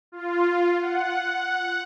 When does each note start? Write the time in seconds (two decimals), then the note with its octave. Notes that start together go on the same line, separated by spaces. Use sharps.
0.12 F4
0.80 F#5